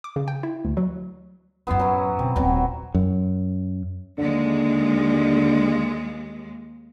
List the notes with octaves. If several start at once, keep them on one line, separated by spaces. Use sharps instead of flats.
D6
C#3
G5
E4
D2
F#3
A1 F#2 B3 E4 C6
F#3 C#4
B2 C4
D#1 B2 F#3 C4
F#2
D#2 D3 G#3